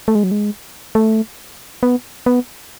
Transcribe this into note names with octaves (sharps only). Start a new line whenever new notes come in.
A3
G#3
F#3
G#3
A3
B3
B3